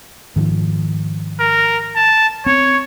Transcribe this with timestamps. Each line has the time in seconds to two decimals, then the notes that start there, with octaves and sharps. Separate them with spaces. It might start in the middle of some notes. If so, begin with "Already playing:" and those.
0.36 G#2 D#3 F3
1.40 A#4
1.96 A5
2.46 C4 C#5